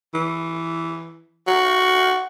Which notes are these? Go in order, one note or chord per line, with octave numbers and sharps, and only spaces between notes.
E3
F#4